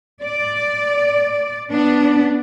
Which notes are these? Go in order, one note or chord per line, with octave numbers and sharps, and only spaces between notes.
D5
B3 D4